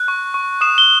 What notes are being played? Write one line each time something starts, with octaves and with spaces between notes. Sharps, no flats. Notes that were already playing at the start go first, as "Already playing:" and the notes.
Already playing: F#6
C#6
C#6
D#6 E7
G7